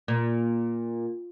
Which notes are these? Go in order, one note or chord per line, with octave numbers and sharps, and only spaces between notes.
A#2